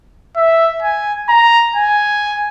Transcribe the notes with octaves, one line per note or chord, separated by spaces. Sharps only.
E5
G#5
A#5
G#5